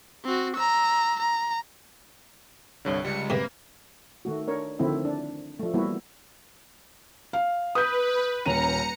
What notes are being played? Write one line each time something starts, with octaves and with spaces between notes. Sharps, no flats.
C4 F#4
A#5 E6
A#5
C2 G2 D3 C#5
C#2 G3 C#7
G#2 C3 D#3 A#3 B4
D#3 A3 F#4
D4 A#4 C#5
D3 D#3 F3 A3 C4 E4
D4
F3 A3
E3 G3 A#3 B3 E4 F#4
F5
B4 D#6 G6
D#1 C#4 A#5 C#7 D#7